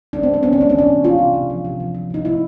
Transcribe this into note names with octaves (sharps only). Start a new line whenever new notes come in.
G#3 D4
C4
G#3
C4
B3 C#4
D4
G#3 C#4
D4
E3 C#4
C3
G#3 F4
C3
C3
F3
C3
F3
F3
C3 D#4
A#3 E4